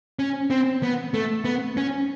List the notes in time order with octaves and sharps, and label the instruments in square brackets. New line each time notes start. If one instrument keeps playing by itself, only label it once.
[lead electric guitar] C#4
C4
B3
A3
B3
C#4